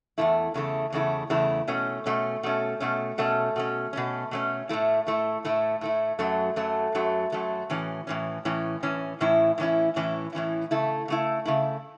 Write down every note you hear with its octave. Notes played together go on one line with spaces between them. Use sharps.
E2 C#3 A3 E4
E2 C#3 A3 E4
E2 C#3 A3 E4
E2 C#3 A3 E4
B2 A3 C#4
B2 A3 C#4
B2 A3 C#4
B2 A3 C#4
B2 A3 C#4
B2 A3 C#4
B2 A3 C#4
B2 A3 C#4
A2 A3 E4
A2 A3 E4
A2 A3 E4
A2 A3 E4
F#2 F#3 A3
F#2 F#3 A3
F#2 F#3 A3
F#2 F#3 A3
A2 E3 C#4
A2 E3 C#4
A2 E3 C#4
A2 E3 C#4
A2 E3 C#4 E4
A2 E3 C#4 E4
A2 E3 C#4 E4
A2 E3 C#4 E4
C#3 A3 E4
C#3 A3 E4
C#3 A3 E4